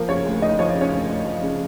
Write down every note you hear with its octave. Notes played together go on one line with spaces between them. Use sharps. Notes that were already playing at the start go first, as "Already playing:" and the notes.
Already playing: F3 A#3 A#4
C#3 C#4 C#5
D2
D2 D#4 D#5
F3 C#5
C#3 D5
C#4 C#5
D2
D2
F3
C#3